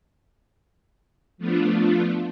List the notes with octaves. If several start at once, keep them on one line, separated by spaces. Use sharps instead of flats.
F3 A3 B3 D4 F4